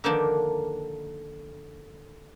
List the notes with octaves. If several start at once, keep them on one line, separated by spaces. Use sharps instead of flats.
D3 D#3 F3 A#3 D4